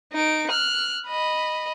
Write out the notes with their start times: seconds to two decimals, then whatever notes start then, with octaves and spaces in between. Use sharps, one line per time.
0.12 D#4 D7
0.50 F6 F#6
1.07 D#5 B5